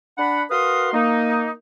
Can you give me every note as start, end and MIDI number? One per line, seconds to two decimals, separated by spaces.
0.17 0.43 62
0.17 0.43 78
0.17 0.43 83
0.49 0.92 66
0.49 0.92 70
0.49 0.92 71
0.49 0.92 77
0.49 0.92 84
0.49 0.92 87
0.93 1.51 58
0.93 1.51 63